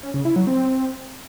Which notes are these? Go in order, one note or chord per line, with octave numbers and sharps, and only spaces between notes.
C#4
C#3
E4
F#3
C4